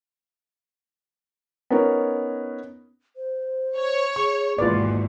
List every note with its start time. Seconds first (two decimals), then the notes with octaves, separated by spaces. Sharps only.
1.70 B3 C#4 D#4 A#4 C#5
3.16 C5
3.76 C#5
4.16 G#4 C#6
4.58 G#1 E2 B2 A#3 F4 B4 D5